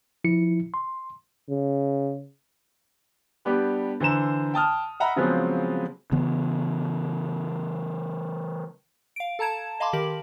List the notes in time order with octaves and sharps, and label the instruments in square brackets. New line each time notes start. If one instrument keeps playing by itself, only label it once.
[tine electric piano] F3 E4 C#7
C6
[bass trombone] C#3
[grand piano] G3 B3 D4 G4
D3 E3 C5 A#5 E7
G5 A5 D#6 F6
D#5 E5 F#5 A#5 B5
C#3 F3 F#3 G#3 B3 C4
[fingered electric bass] C#3 E3 B3
[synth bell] F5 D7
A4 A5 A#5 G#6 E7
D#5 F5 A5 B5 C6 D6
D#3 G4 A#4 F#7